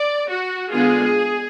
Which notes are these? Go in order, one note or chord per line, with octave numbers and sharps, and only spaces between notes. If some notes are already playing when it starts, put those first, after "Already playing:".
Already playing: D5
F#4
D3 G#3 B3 D4 F4 G#4